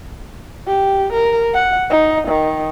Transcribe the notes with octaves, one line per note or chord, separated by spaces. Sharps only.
G4
A#4
F#5
D#4
D#3